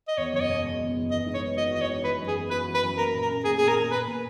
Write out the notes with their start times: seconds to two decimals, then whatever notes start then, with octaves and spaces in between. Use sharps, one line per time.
0.08 D#5
0.17 E2 C#5
0.33 F#1 C#5
0.41 D#5
0.49 B2
0.64 G#3
0.80 E2
0.96 F#1
1.11 E3 D#5
1.26 G#2
1.34 C#5
1.42 B3
1.57 F#4 D#5
1.73 E3 D#5
1.81 C#5
1.89 G#2
2.04 E3 B4
2.20 F#2
2.28 G#4
2.35 B3
2.51 F#4 B4
2.67 E3
2.74 B4
2.82 F#2
2.98 A#3 A#4
3.14 A#2
3.22 A#4
3.29 C#4
3.44 A#2 G#4
3.58 A#3 G#4
3.68 A#4
3.76 A#2
3.91 A#3 B4
4.07 A#2